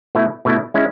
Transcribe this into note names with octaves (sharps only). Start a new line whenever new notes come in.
B2 A3 E4
B2 A3 E4
G#3 C#4 E4